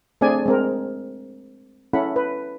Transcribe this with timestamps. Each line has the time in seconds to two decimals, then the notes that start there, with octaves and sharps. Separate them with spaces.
0.21 A3 C4 D4 G#4 D5 G#5
0.46 G#3 C4 A#4
1.93 C#4 E4 A4 F#5 B5
2.16 B4